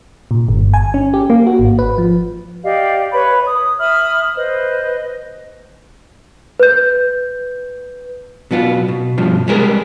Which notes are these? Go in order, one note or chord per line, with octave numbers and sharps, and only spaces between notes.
A#2
G1
G#5
C#4
G4
A#3
F#4
G#1
B4
F3
G4 D5 D#5 F5
B4 C#5 B5
D#6
E5 B5 D#6 F6
B4 C5 D#5
B4 G6
B2 F#3 B3 F4
B2
G2 B2 F3
G3 G#3 G#4 A#4 B4